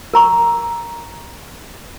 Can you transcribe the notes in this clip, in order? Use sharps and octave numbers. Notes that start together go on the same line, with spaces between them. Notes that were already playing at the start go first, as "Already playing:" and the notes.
A#4 A#5 C#6